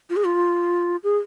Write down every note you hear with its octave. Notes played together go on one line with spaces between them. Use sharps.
F4
G#4
F4
G#4